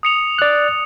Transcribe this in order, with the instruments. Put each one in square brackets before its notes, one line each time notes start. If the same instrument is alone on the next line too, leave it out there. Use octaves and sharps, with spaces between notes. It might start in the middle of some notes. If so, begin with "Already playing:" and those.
[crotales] D#6 C#7 F7
[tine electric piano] D5 F#6